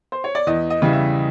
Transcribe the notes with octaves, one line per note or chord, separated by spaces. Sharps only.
C5
C#5
D5
E2 D#5
D#5
C#3 E3 G3
E5